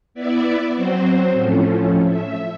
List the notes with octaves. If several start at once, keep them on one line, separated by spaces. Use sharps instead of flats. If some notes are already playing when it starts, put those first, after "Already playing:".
B3 E4 D5 E5
F#3 C4 F#4 C5
A2 F3 A3 C#4
E5